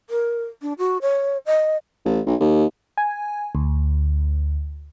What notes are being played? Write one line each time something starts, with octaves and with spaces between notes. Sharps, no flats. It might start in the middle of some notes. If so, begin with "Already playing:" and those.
A#4
D4
F#4
C#5
D#5
A1
B1
D#2
G#5
D2